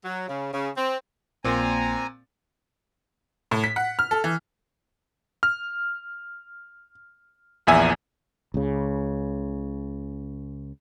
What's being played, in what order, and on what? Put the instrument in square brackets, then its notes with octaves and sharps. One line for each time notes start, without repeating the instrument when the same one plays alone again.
[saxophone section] F#3
C#3
C#3
C4
[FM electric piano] A#1 A#3 C6 [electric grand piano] A#2 C4 [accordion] G#5 A#5
[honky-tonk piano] A2
B6
F#5
F6
A4
E3
[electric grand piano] F6
A#1 E2 E5 G#5
[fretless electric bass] C#2 C#3